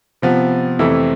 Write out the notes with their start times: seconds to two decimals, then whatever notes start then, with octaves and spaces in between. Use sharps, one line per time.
0.22 C3 F3 B3
0.79 F2 C3 E3 A3 E4